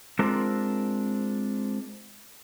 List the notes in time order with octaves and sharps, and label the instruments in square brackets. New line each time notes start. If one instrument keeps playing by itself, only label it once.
[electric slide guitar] G#3 C4 D4 F4 A#4